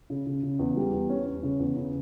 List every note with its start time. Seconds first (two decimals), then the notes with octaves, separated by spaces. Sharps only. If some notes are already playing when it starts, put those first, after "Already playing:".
0.10 C#3
0.26 C#3
0.43 C#3
0.59 E2
0.77 G3
0.93 E2
1.10 C#4
1.26 C#4
1.43 C#3
1.60 E2
1.77 C#3